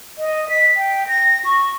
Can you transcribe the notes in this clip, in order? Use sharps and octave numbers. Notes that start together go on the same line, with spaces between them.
D#5
B6
G5
A#6
C#6